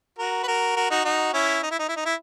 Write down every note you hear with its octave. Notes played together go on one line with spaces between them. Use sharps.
F#4 A#4
B4
F#4 A#4
F#4 A#4
D#4 F#4
D#4 F#4
C#4 E4
D#4
E4
D#4
E4
D#4
E4